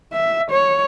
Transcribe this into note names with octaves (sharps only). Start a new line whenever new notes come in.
E5
C#5